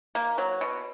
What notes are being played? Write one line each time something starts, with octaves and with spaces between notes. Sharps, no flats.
A#3
F#3
B2